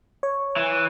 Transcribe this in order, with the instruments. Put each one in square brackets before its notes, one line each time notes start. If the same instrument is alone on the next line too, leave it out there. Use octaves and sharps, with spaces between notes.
[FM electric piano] C#5
[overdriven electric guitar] E3